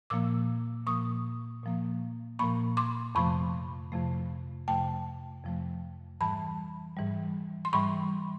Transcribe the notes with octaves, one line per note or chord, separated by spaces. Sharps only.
A#2 F3 A#3 D6 E6
A#2 F3 A#3 C#6 D#6
A#2 F3 A#3
A#2 F3 A#3 B5 C#6
C6 D6
F2 C3 F3 A3 B5 C#6
F2 C3 F3 A3
F2 C3 F3 A3 G5 A5
F2 C3 F3 A3
G#2 E3 G3 A5 B5
G#2 E3 G3
C6
G#2 E3 G3 B5 C#6